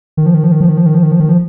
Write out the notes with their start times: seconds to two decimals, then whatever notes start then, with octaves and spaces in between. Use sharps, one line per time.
0.17 D#3
0.26 F3
0.34 D#3
0.44 F3
0.52 D#3
0.61 F3
0.69 D#3
0.77 F3
0.86 D#3
0.94 F3
1.03 D#3
1.12 F3
1.20 D#3
1.29 F3